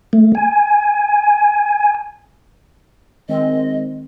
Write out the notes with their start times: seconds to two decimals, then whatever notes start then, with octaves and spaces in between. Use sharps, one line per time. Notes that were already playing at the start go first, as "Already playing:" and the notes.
0.13 A3
0.35 G#5
3.29 D#3 G#3 C4 D#5